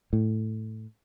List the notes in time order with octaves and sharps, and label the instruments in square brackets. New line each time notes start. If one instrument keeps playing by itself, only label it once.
[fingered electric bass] A2